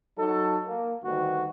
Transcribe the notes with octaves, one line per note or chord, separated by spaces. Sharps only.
F#3 D#4 A4
A#3
D2 G2 D#3 F#4